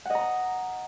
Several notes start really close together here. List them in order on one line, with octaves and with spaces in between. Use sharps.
F#5 D#5 A#5